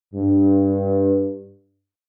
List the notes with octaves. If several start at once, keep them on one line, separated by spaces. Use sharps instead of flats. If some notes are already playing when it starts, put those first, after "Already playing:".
G2